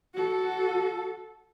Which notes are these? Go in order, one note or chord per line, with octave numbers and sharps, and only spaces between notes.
F#4 A4